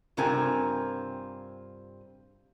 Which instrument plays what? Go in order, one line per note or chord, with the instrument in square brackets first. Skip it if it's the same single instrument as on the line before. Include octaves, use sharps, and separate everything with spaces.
[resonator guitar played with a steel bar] G2 C3 C4 F4 A#4 G#5